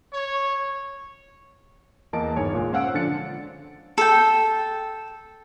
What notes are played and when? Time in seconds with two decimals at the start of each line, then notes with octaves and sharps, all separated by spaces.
0.13 C#5
2.13 E2 A#3 D#5 A5 D7
2.36 G1 G#2 C#5 G#5
2.53 A#2 G#3
2.72 C#4 C5 F5 F#5 E6 D7
2.94 D3 F3 D4 A6 C#7
3.98 A4 G5